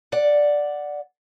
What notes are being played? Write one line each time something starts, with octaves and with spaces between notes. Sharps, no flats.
D5 F#5